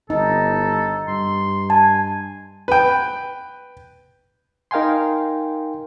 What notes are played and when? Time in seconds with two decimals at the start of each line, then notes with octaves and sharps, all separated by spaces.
0.10 G1 D#4 A4
1.08 G2 C6
1.70 G#5 A5
2.68 B4 G5
4.71 D#4 A#4 F5 G5 G#5 C6